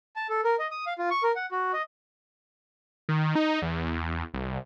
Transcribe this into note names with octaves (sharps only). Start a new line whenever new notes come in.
A5
A4
A#4
D#5
D#6
F5
F4
C#6
A#4
F#5
F#4
D#5
D#3
D#4
E2
C2